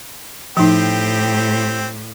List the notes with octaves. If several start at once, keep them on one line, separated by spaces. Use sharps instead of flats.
A2 F3 C4 D#4 G4